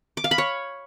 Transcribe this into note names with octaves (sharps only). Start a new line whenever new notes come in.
D6
F5
B5
C#5